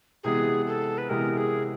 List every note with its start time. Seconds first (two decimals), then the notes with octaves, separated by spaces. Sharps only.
0.24 C3 E3 G#3 B3 G#4
0.67 A4
0.98 B4
1.09 C3 E3 G#3 B3 A#4
1.37 G#4